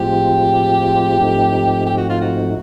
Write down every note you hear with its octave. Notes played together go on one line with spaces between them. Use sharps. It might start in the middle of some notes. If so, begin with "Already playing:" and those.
Already playing: A2 F3 G#3 C4 F4 G4
G#2 F3 A3 C4 D#4
G4
F#4
F4
F#4